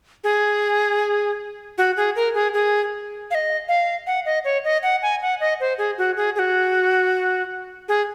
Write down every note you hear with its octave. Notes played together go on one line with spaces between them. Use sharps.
G#4
F#4
G#4
A#4
G#4
G#4
F5
D#5
F5
F#5
D#5
C#5
D#5
F#5
G#5
F#5
D#5
C5
G#4
F#4
G#4
G#4
F#4
G#4